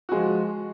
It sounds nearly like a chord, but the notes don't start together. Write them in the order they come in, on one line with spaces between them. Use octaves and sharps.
F#4 G#3 F3